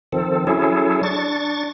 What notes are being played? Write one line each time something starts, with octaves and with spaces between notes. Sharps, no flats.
D#3 F3 C4 A4
F#3 C#4 E4 G#4 A4
D4 C#6 A6